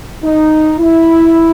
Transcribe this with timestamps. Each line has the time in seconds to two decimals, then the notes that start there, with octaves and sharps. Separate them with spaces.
0.24 D#4
0.79 E4